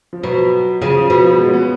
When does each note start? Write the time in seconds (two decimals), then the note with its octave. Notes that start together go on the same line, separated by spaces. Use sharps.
0.13 F3
0.23 B2 F#3
0.82 C#3 F3
0.96 F3
1.10 B2 F3
1.25 F3
1.38 G#3
1.49 C#4
1.53 B3